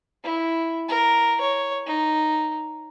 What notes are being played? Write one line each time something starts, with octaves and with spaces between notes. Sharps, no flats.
E4
A#4
C#5
D#4